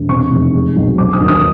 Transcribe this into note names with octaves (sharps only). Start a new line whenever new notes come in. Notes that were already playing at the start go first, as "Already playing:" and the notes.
Already playing: E1
C3 C#6
F1
G#3
B1
F#3 D6
D#6
D#2
D#6